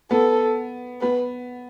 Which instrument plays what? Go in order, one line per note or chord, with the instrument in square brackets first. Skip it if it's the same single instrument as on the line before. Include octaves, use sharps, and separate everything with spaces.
[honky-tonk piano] B3 [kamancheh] A4
[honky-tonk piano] B3 [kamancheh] B4